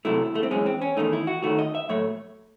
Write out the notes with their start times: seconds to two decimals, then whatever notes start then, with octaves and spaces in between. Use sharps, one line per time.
0.05 C3 F#3 A3 E4
0.35 A3
0.43 C4
0.51 F#2 E3 G#3 C#4
0.66 C4
0.82 C#4
0.97 E2 D#3 A3 D#4
1.13 E4
1.27 F#4
1.43 F#2 D#3 F#3 A3 F#4
1.58 D#5
1.75 E5
1.89 A2 F#3 A3 C#5